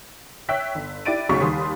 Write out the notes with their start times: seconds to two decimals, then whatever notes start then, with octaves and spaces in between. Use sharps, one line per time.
0.49 C#5 E5 G5 E6 F#6 B6
0.75 G1
1.05 E4 G4 D5 A6 D7 D#7
1.29 D2 C#3 F#3 D#4 C#6 B6
1.41 D#2 D#3 G3 C6 D#6